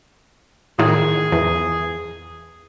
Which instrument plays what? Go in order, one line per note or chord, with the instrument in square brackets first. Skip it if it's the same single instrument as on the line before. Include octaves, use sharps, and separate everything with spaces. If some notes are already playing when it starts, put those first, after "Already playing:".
[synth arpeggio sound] A2 D#3 [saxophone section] G#4
[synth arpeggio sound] E2